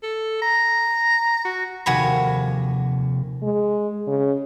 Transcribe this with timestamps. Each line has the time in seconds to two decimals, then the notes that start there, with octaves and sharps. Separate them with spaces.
0.03 A4
0.42 A#5
1.45 F#4
1.86 F1 D#2 C3 F#4 G#5 B5
3.42 G#3
4.07 C#3